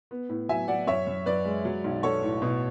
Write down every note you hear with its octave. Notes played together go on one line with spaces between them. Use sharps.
B3
A2
F#3 E5 G#5
F#3 D5 F#5
F#2 C#5 E5
F#2
F#2 B4 D5
G#3
F#3
B1
F#3 A4 C#5
A2
B2